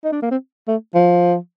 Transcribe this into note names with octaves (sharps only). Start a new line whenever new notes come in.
D#4
D4
A#3
C4
A3
F3